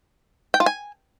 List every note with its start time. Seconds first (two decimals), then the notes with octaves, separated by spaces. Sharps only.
0.54 G5
0.60 F4
0.66 G#5